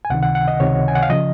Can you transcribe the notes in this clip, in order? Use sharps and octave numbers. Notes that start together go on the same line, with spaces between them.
G#5
C#2 C3 D#3 F#5
F#5
F#5
D#5
C#2 C3 D#3 C#5
G#5
F#5
F5
C#3 F3 D#5